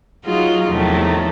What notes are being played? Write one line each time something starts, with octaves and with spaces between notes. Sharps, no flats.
F#3 D#4 F4 F#4 G#4
E2 A2 C3 D#3 F3 A3